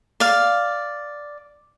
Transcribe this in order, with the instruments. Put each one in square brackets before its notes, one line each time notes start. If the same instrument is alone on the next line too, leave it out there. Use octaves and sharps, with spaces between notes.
[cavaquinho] D5 F5